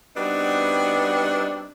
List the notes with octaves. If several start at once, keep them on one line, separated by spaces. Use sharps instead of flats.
G3 B3 C4 D4 D#4 F#4